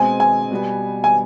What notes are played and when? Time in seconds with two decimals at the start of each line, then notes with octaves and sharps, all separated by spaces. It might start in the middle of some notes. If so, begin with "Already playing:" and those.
Already playing: B2 G#3 C4 G#5
0.20 G#5
0.51 B2 G3 B3
1.04 G#5